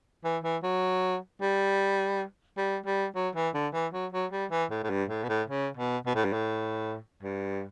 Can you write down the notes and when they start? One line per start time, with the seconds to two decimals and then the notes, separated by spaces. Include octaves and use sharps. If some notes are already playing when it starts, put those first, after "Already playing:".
0.24 E3
0.44 E3
0.63 F#3
1.41 G3
2.58 G3
2.86 G3
3.15 F#3
3.35 E3
3.54 D3
3.73 E3
3.93 F#3
4.12 F#3
4.32 G3
4.51 E3
4.71 A2
4.83 A2
4.90 G2
5.09 A2
5.24 B2
5.29 A2
5.48 C#3
5.77 B2
6.06 B2
6.15 A2
6.25 G2
6.33 A2
7.23 G2